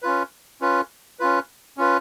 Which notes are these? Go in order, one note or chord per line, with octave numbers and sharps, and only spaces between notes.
C#4 F4 B4
C#4 F4 B4
C#4 F4 B4
C#4 F4 B4